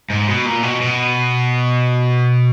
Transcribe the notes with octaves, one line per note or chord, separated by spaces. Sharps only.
G#2
B2
A#2
B2
B2